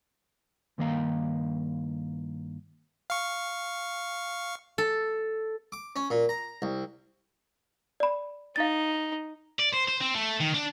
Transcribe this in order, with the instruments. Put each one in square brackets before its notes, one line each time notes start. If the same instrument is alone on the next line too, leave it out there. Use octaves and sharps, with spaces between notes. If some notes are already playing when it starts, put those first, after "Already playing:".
[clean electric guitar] G2 D#3 A#3 D#5 F5 A#5
[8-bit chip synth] F5 C#6
[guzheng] A4
[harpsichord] D6
C#4
A#2
A#5
C2
[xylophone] D5 B5
[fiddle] D#4 [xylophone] F5 A6
[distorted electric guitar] D5
C5
C5
C4
A3
D#3
D4